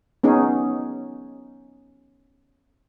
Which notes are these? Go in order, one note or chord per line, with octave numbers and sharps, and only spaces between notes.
B3 C#4 D#4 G#4